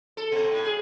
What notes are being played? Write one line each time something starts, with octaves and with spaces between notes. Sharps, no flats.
A4
B2
A2
G#4